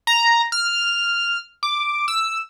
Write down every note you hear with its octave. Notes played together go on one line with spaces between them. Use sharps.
A#5
F6
D6
E6